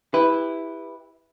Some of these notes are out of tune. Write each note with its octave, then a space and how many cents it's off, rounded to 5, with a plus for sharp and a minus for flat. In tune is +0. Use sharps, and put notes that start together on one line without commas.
E4 -5 G4 +25 B4 +0